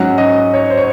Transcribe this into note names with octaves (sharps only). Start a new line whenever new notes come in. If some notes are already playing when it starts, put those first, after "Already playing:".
Already playing: G#2 F#3 C#4 F#5
D#5
C#5
C5
C#5